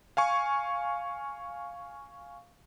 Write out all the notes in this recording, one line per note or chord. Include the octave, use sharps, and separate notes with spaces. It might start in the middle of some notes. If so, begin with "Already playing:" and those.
F5 G#5 C#6